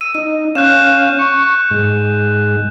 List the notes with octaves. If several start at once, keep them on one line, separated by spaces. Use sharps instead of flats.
E6 D#7
D#4 D#7
C#4 F5 F#6 G6 E7
C#6
G#2